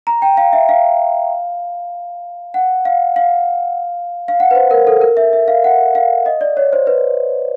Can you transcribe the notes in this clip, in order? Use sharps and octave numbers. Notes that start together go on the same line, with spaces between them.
A#5
G5
F5
E5
F5
F#5
F5
F5
F5
F#5
B4
C5
A#4
A4
A#4
E5
E5
F5
F#5
F5
D#5
D5
C#5
C5
B4